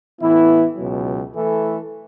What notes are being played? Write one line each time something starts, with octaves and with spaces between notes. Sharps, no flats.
A2 E3 B3 E4
C#2 B2 F#3
E3 A3 E4 A4